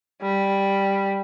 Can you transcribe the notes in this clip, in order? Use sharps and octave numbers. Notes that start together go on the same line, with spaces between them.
G3